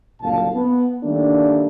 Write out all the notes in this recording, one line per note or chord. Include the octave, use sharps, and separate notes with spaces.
F#1 C2 A#2 D3 F5 A5
B3
D#3 G3 A3 A#3 D4